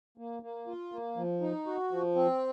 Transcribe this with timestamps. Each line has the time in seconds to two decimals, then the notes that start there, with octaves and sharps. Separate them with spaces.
0.18 A#3
0.43 A#3
0.67 F4
0.92 A#3
1.17 F3
1.41 D#4
1.66 F#4
1.91 F3
2.15 C4